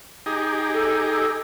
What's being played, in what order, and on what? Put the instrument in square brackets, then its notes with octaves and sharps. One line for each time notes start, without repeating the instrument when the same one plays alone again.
[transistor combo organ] D#4 G4 G#4
[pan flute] A4